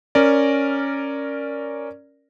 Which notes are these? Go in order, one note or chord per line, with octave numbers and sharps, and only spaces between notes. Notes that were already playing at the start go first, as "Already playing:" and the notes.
C#4 A#4 D5